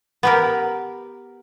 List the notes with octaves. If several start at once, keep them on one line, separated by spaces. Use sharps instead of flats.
B3 G4 A#4